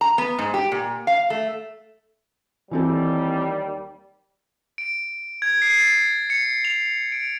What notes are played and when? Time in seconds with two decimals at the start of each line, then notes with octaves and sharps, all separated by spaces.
0.01 A#5
0.18 B3
0.39 G#2
0.54 G4
0.72 A#2
1.07 F5
1.30 A3
2.71 D#2 E3 G3 C4 A4
4.78 D7
5.42 G#6
5.62 C7
5.79 A6
6.30 C#7
6.65 F7
7.12 D7